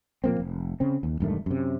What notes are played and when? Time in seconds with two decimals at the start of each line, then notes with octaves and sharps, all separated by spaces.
0.24 A#2 F3 A#3 C4
0.40 F1
0.80 C#3 C4
1.03 D#2
1.20 E1 G2 D#3 A3
1.46 F#2 C3